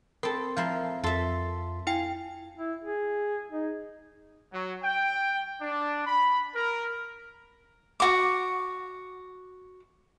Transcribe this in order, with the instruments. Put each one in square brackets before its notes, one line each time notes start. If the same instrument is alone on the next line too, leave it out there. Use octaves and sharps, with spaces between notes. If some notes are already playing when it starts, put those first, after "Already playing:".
[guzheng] C4 A4 [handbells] A#4 [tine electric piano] B5
[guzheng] F3 E4 C6 [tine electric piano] F5 A#5
[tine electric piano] F2 F4 C6 [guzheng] A4 E5
[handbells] E4 G5 C7 [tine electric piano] F5 G#5
[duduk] E4
G#4
D#4
[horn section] F#3
G5
D4
B5
A#4
[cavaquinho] F#4 D6